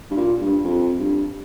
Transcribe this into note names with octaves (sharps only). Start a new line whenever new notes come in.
G2
A#2
G2
F2
G2